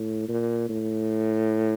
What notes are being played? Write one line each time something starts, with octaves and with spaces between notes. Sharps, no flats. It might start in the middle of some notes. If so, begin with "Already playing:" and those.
Already playing: A2
A#2
A2